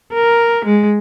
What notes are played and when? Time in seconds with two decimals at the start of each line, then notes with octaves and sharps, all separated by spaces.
0.13 A#4
0.65 G#3